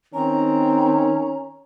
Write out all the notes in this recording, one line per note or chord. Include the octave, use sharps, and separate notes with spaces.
D#3 C4 C#4 A#5